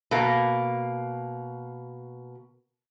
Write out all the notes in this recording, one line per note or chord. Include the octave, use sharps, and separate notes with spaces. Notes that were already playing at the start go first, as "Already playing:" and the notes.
B2 A#3